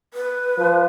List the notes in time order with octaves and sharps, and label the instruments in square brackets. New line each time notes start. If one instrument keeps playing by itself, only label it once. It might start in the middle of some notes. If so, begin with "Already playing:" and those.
[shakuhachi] B4
[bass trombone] F3